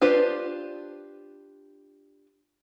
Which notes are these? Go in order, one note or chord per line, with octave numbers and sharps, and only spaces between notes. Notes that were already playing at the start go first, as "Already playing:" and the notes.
D4 F4 G4 B4 C5